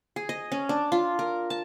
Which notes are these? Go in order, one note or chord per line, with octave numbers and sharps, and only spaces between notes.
G#4
D#5
C#4
D4
F4
A#4
A5